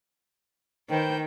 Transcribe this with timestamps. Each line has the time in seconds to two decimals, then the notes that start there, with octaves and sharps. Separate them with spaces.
0.90 D#3 B4 C5 G5